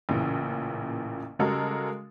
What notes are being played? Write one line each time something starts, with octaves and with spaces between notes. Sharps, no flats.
A1 A#2 C#3 E3
C#3 G3 G#3 F#4 A4 A#4